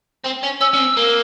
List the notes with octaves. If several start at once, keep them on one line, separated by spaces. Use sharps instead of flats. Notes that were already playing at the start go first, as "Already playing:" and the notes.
C4
C#4
C#4 E6
C#4
C4
A#3